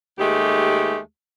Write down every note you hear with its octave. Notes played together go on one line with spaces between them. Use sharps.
D#2 G#3 A3 G4